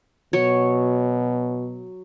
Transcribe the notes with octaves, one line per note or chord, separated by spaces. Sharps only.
B2 F#3 F#4 C#5